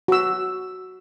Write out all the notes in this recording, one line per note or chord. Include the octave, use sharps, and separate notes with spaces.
F#4 E6